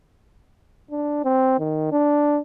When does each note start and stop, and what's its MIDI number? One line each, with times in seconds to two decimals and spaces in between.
0.91 1.23 62
1.24 1.58 60
1.59 1.90 51
1.92 2.39 62